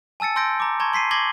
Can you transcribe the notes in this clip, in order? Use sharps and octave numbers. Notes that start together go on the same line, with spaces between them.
G#5 A5 E6 A6 C#7
A5 C6 E6 G6 A#6 D7
A#5 D6
A5 A#5 C6 C#6 G#6
C6 B6 C7 D#7
D6 G#6 A#6 C7 F#7 G7